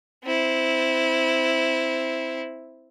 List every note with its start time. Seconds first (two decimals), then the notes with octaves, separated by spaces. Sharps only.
0.24 C4 E4